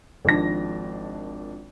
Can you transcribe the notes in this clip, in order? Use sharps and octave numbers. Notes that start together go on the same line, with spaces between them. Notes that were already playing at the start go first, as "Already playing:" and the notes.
G#1 D#3 F3 D4 A#6